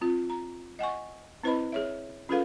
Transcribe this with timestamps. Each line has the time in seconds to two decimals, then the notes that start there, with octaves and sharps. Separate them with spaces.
0.01 C4 F4
0.30 A#5
0.79 D#5 F#5 G#5 C#6
1.43 C4 E4 B4 C5 D#5 B5
1.72 G#4 C#5 E5
2.29 C#4 F4 G#4 A4 B4 F5